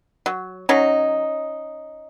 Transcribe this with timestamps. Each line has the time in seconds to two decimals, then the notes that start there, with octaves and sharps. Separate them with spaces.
0.26 F#3
0.69 F#3 C#4 D#4